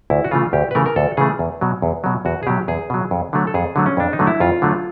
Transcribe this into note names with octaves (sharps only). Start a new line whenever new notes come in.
D2 E4
F#4
C#3 E3 A3 F4
D2 G4
B4
C#3 E3 A3 A#4
A#4
D2 A4
C#3 E3 A3 G#4
E2
B2 F#3
E2
B2 F#3
E2 F#4
G#4
B2 F#3 G4
E2 G#4
B2 F#3
F2
D3 F#3 A3
A4
F2 G#4
D3 F#3 A3
C#4
F2 D4
D#4
D3 F#3 A3
E4
F2 F4
D3 F#3 A3